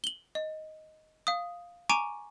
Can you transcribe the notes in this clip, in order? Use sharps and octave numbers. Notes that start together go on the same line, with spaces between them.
F#7 G7
D#5
F5 D#6
G#5 A#5 C#6 D6 D7 D#7